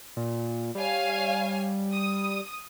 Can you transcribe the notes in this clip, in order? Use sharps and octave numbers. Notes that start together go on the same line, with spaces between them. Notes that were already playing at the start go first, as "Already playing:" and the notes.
A#2
G3 C#5 F5 G#5
D#6